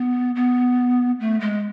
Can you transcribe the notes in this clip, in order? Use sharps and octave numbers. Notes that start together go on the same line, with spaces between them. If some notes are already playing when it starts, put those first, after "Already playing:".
Already playing: B3
B3
A3
G#3